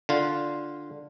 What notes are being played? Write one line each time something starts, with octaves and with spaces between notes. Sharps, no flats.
D3 F4